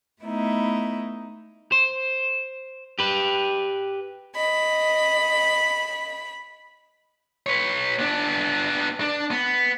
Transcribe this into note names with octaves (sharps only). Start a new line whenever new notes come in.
A3 B3 D#4 E4
C5
G4 B4
D#5 B5
B4 C#5
B3 D4
D4
B3